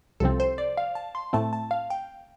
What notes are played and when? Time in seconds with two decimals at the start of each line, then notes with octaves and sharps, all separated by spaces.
0.20 C2 C3 F3 C4 A4
0.40 C5
0.58 D5
0.77 F5
0.95 A5
1.15 C6
1.33 A2 A3 C4 A5
1.53 A5
1.71 F5
1.90 G5